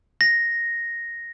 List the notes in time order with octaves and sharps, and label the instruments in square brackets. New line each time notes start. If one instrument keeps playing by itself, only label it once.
[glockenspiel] A#6